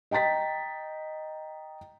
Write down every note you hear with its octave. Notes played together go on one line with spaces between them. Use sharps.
D#5 G5 A#5 A6 B6